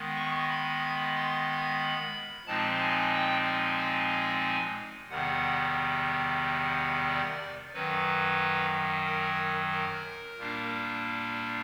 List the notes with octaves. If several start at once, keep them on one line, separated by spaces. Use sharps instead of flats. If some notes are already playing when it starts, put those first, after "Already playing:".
Already playing: D#3 G#3 B3
C#6
B5
C6
B5
A#2 F3 G#3 C4 D#4 A5
G#5
G5
G#5
E2 C3 D#3 G3 B3 F#5
D5
F#2 D#3 F#3 B4
A#4
A#4
A#2 G3 A#3 D4